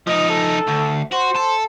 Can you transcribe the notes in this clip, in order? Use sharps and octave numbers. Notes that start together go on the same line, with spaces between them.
F3 D#4 D#5
A4
D2
F#4 C5
A4